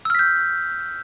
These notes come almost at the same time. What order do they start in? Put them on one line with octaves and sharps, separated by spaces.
E6 F6 B6 G6